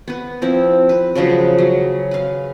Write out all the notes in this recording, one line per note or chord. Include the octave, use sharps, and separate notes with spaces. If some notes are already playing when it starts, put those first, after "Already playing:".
B3 B4
F3 C4 E4
B4
C#3 F3 F#3 G#3
F#3
B4 F5